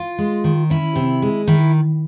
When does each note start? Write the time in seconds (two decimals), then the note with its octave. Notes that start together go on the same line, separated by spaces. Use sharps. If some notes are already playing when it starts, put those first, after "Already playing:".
Already playing: F4
0.18 G#3
0.44 D#3
0.70 C#4 E4
0.96 C3
1.22 G#3
1.47 D#3 E4